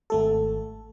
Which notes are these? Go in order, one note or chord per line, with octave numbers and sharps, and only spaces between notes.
G#1 A3 A4